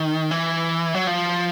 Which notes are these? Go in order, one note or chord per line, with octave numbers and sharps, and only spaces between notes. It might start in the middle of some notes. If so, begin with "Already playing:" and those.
Already playing: D#3
E3
F#3
F3